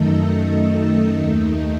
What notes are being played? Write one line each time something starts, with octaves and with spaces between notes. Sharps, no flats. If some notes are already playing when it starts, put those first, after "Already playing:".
Already playing: F#2 D#3 A3 D#4 A4
D#2 D#3 A3 D#4